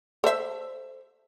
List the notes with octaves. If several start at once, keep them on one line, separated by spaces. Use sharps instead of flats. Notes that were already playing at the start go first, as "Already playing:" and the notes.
A4 C5 E5